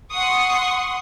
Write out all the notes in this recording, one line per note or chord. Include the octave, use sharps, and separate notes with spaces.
F#5 C6 C#6 D#6